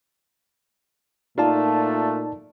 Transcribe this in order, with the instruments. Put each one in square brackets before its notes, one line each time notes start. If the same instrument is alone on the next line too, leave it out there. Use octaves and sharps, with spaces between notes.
[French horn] A#2 [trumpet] A3 [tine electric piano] D#4 D5 A5 [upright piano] F4